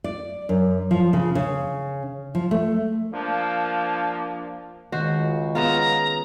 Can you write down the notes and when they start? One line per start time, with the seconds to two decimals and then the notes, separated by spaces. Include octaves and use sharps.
0.04 D5
0.49 F#2
0.91 F3
1.13 C#3
1.35 C#3
2.35 F3
2.51 A3
3.13 F3 A#3 D4
4.92 C#2 D#3 F#4 C5
5.55 C#3 B3 F4 A#5